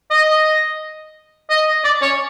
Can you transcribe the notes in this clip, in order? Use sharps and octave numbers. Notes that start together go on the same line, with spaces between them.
D#5
D#5
D5
C#5